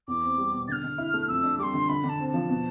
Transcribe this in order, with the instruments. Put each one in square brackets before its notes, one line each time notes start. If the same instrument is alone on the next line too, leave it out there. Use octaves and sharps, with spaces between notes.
[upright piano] E2 [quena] D6
[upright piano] C4
G3
B2
[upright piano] D3 [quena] F6 A6
[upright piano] D3
E4
A3
[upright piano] F2 [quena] E6
[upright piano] D4
[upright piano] G3 [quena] D6
[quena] C6
[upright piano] D3
[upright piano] D3 [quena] B5
[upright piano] D3
[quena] A5
[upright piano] C4
[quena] A5
[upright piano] F3
B2